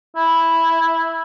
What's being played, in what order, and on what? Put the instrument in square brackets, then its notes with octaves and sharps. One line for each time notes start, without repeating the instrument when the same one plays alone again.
[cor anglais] E4